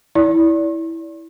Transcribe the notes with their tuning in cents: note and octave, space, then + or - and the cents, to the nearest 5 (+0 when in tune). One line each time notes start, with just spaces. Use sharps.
E4 -10 D5 -30